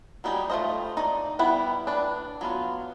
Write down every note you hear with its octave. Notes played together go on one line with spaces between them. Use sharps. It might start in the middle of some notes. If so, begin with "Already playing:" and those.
F#3 G3 D#4 G4 G#4
A3 B3 F4 C5 D#5
D#4 D5
G3 B3 E4 F#5 G5
D4 B4
F#3 B3 F4